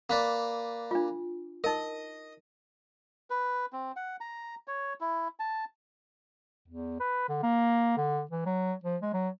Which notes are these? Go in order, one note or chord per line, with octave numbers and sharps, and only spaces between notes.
A#3 B4 D5
D4 F4
D#4 A#4 D#5
B4
C4
F#5
A#5
C#5
E4
A5
E2
B4
D3
A#3
D3
E3
F#3
F3
G#3
F#3